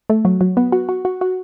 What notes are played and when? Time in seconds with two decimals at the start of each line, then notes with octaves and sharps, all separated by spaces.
0.10 A3
0.25 F#3
0.41 F#3
0.57 B3
0.72 F#4
0.89 F#4
1.05 F#4
1.21 F#4